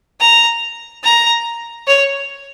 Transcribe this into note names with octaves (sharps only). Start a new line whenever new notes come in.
A#5
A#5
C#5